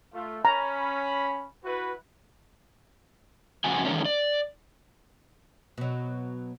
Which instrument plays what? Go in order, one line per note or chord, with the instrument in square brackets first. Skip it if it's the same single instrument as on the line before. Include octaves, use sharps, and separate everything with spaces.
[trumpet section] A3 F4
[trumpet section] C#4 B5 [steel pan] A#5
[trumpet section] E4 F#4 B4
[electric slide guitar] F2 A2 C#3 F#4 G#5
D#3 E3 G#3 A#3 C#4 D4
D5
[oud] B2 F#3